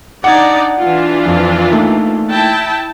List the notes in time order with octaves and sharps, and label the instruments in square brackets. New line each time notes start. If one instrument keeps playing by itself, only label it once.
[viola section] D4 D#4 D5 [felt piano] F#5 G#6
[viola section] E3 D4 F4
[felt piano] F2
A3 A#3 D#4
[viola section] E4 G5 A5